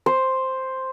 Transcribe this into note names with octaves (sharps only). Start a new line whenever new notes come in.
C5